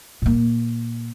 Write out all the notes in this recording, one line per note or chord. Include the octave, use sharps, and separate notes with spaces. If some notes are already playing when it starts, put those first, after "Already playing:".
A#2 A#3